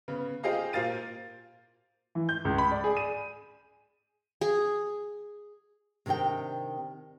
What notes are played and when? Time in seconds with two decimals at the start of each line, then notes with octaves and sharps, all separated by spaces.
0.08 C#3 B3
0.43 F4 G4 G#4 C5 D#5 F5
0.73 A#2 A#3 C5 F5 A6 D#7
2.15 E3
2.29 G6
2.45 C#2
2.58 B5
2.71 D5
2.84 G#4
2.97 D#7
4.41 G#4
6.06 C3 D#3 D4 G4 G5